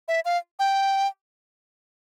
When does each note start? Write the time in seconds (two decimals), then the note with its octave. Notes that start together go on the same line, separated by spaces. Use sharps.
0.08 E5
0.25 F5
0.59 G5